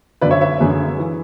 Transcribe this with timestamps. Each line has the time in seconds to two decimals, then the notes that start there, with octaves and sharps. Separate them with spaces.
0.21 F#2 D3 B4 D5
0.31 C#5 E5
0.41 C#5 E5
0.60 F#2 D3 G#4 B4
0.98 E3